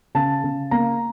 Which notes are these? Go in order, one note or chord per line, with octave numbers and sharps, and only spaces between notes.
C#3 A5
C#3
A#3 A#5